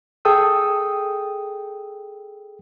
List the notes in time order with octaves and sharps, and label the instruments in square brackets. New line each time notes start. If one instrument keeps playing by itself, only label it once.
[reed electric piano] G#4 A4 G5 D#6 E6